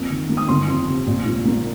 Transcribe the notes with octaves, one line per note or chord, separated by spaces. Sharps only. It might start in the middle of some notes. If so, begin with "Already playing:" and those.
Already playing: F2 A#3
D#3
A#3
D#6
G1 C6
F2
C3
A#1
A#2
A#3